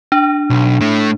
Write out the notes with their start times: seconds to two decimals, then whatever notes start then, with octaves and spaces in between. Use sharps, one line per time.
0.12 D4
0.50 B1
0.81 A2 A3